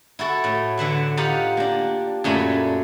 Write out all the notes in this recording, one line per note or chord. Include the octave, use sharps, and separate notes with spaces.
E4 F#4 A4
A2
D3 E3 E5 F#5
D#4 F4 G4 F5 F#5
A#3 D4
F#2 A#2 A3 G#5 B5